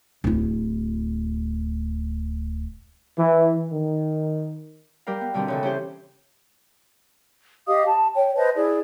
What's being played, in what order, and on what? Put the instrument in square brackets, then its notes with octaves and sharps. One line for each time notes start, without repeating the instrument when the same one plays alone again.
[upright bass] D1 E4
[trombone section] E3
D#3
[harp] G3 G4 A#4 F5
B3
B2 D3 G3 C4 A#4
C#3 E3 A4
C#4 E4 G4 C5
[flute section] G4 D#5 F5 D#6
A5
C#5 G5
B4 C5 D#5 A5
E4 G#4 D5